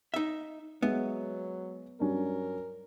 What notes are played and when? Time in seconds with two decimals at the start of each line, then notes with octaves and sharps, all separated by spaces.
0.14 D#4 E5
0.83 F#3 G#3 B3 E5
2.00 G2 F#3 C#4 A#4